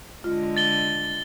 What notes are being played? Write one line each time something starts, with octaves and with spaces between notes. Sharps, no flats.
D3 G#3 F4
A6 G7